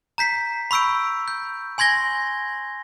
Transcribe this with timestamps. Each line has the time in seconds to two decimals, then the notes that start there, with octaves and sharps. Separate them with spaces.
0.18 A#5 G6 B6 C7
0.71 B5 C#6 E6 G6 D7
1.28 G6
1.78 G#5 C6 G#6 A#6 G7